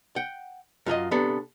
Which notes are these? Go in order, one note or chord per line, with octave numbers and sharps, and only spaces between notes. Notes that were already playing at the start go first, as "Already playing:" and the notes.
F#5 G5
F#2 F4 G#4 D#5
C3 B3 D4 A4